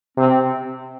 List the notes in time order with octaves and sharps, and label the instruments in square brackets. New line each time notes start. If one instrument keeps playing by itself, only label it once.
[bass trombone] C3 [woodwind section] C4